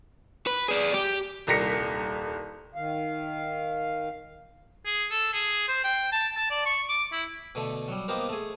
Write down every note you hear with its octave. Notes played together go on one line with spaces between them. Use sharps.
B4
G#4 D5
G4
D#1 C2 A#4 A#6 B6 C#7
D#3 F5
G#4
A4
G#4
C5
G5
A5
A5
D5
C#6
D6
E4
B2 D3 A3
F#3 G3
A#3 B3 D#4 G4 A#4 C5
A3 G#4